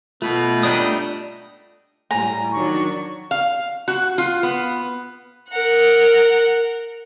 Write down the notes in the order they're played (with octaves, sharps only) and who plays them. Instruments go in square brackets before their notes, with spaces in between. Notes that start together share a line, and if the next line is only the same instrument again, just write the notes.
[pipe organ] B2 B4 [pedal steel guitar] A3 [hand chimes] F4
[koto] G3 D4 D#4 [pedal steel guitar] A3 D#6
[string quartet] A2 G3 A#6 [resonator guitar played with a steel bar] G#5 [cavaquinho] A#5
[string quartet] D#3 F#3 D4 [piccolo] C#6
[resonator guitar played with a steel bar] F5
F#4
F4
B3
[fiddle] A#4 F#5